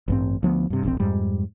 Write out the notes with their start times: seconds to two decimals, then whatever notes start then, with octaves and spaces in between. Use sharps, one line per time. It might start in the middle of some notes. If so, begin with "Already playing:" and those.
0.08 A1 G2 C4
0.43 D2 F3 B3
0.70 G2 C3
0.83 E1 A#1 B2 C4
1.00 F2 G#2 G3